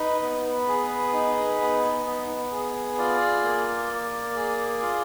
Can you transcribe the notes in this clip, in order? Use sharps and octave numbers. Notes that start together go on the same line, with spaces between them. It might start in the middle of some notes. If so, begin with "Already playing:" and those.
Already playing: D#4 B4
B3
G#4
D#4
B3
B3
G#4
F4 D5
A#3
A#3
G#4
F4